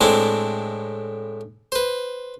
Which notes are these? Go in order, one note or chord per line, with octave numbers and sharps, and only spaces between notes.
A2 G#3 C4 D4 E4
B4 C5